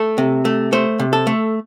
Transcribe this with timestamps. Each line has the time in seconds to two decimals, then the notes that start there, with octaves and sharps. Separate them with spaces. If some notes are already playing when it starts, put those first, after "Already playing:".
Already playing: A3 A4
0.18 C3
0.45 A3
0.73 A3 C5
0.99 C3
1.13 A4
1.27 A3